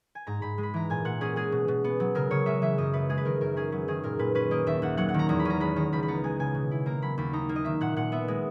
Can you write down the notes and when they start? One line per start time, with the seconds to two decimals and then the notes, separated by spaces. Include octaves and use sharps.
0.15 G#5
0.27 G#2 A#5
0.42 G#2 B5
0.58 G#3
0.63 B5
0.74 E3 A#5
0.90 A#2 G#5
1.05 A#2 F#5
1.21 C#4 G#4
1.36 G#3 G#4
1.52 B2
1.68 B2
1.84 B3
2.00 F#3
2.15 C#3 A#4
2.31 C#3 C#5
2.46 G#3 E5
2.62 E3 E5
2.78 F#2 D#5
2.93 B3 B4
3.09 G#3 G#4
3.17 B4
3.25 D#3 A#4
3.41 F#2 A#4
3.56 C#4 G#4
3.72 F#3 B4
3.88 D#3 G#4
4.03 A#2 A#4
4.19 A#2 B4
4.35 C#4 B4
4.51 A#3 D#5
4.67 D#2 E5
4.82 D#2 F#5
4.97 F#3 F#5
5.09 F#5
5.14 D#3 A#5
5.29 E2 A#5
5.39 B5
5.45 C#4 A#5
5.60 G#3 B5
5.76 D#3 A#5
5.92 C#2 B5
6.03 B5
6.08 B3 A#5
6.24 G#3 G#5
6.39 C#3 G#5
6.55 B2
6.71 E4
6.86 A#3 A#5
7.02 F#3 B5
7.18 D#2 B5
7.33 D#4 A#5
7.49 A#3
7.56 D#5
7.65 D#3 E5
7.81 A#2 F#5
7.96 A#2 F#5
8.12 B3 E5
8.28 G#3